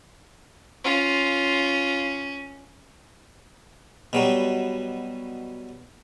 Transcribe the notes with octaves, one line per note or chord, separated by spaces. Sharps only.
C#4 F4
B2 F#3 G3